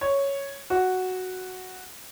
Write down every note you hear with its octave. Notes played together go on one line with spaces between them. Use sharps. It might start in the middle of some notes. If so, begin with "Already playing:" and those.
C#5
F#4